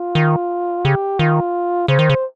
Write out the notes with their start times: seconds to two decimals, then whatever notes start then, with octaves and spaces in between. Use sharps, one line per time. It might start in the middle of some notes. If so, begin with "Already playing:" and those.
Already playing: F4
0.15 D#3
0.85 C#3 G4
1.19 D#3 F4
1.88 C#3 C5
1.99 D#3
2.10 C#3